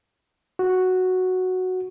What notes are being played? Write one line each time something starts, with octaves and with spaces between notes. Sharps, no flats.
F#4